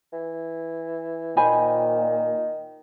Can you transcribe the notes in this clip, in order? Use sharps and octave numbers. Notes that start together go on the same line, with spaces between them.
E3
A#2 D#3 C5 G#5 B5